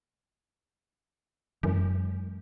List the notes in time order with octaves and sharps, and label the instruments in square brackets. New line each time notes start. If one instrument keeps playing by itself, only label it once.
[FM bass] F#2 [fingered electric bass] E3 F#3 G#3